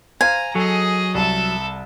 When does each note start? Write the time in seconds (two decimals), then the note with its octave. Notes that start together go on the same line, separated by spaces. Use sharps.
0.21 C5 F5 G#5 A#5
0.55 F#3 G#4 A4 D#5
1.15 C2 A4 E5 A5